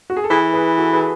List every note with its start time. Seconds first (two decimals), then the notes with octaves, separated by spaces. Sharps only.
0.10 F#4
0.17 G#4
0.24 A4
0.30 E3 G#4 B4
0.54 G#4 B4
0.78 F#4 A4
0.93 G#4 B4